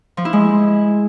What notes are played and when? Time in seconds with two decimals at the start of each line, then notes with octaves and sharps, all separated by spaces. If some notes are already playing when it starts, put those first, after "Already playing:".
0.17 F3
0.25 E4
0.33 G#3